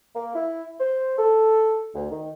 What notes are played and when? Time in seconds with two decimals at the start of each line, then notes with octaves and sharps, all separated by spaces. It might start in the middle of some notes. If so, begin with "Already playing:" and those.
0.15 A#3
0.35 E4
0.79 C5
1.17 A4
1.95 D2
2.10 D#3